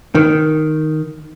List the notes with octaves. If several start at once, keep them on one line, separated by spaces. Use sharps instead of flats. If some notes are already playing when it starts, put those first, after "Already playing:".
D#3